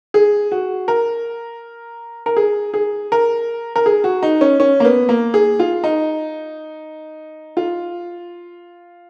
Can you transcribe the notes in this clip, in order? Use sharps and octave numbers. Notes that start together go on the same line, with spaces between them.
G#4
F#4
A#4
A#4
G#4
G#4
A#4
A#4
G#4
F#4
D#4
C#4
C#4
A#3
B3
A#3
G#4
F4
D#4
F4